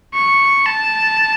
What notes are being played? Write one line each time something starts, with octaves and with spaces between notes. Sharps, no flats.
C#6
A5